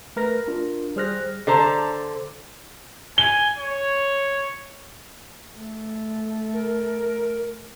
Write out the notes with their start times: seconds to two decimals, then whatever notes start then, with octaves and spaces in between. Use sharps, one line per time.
0.16 A3 A#4 B4 A#6
0.48 D4 F4 A#4
0.96 G3 G#4 C5 F6 F#6 A#6
1.47 D3 A4 C5 A#5
3.18 G#5 G7
3.58 C#5
5.57 A3
6.54 A#4